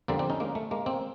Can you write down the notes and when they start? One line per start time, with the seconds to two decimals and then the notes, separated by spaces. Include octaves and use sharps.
0.08 F2 D3 G3 A#3 C4
0.19 C4 D4
0.30 C#4 D#4
0.40 G#3 A#3
0.55 A3
0.71 G#3 A#3
0.86 A#3 C4